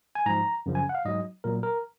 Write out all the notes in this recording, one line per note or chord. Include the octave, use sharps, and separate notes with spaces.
G#5
G#2 F3 A#5
F#2 C#3 F3
G#5
F#5
F5
G#2 F#3 D#5
A#2 F#3 A#4
A#4